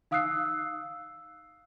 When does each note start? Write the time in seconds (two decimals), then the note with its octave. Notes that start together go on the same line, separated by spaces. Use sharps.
0.11 D#4 F5 D#6 E6 F#6 C7